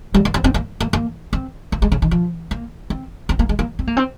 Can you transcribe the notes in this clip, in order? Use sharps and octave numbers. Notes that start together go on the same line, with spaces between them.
G3
A#3
C4
C4
A#3
A#3
A#3
C4
A#3
G#3
C#3
D#3
F3
A#3
C4
C4
A#3
G#3
A#3
C4
A#3
C4